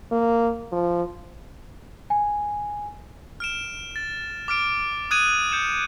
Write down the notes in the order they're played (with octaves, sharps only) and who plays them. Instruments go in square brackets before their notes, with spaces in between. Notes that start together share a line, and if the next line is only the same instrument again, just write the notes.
[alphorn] A#3
F3
[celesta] G#5
[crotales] F6 D7 E7
A6
D6 F6 D7
D#6 F#6 G#6 D#7
G6 C#7 E7